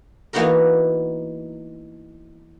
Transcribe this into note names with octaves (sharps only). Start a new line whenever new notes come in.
E3 A#3 B3 D#4 F#4 A#4